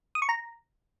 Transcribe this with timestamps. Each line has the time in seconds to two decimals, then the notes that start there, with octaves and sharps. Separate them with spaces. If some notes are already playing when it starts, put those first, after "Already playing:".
0.15 D#6
0.22 C#6
0.29 A#5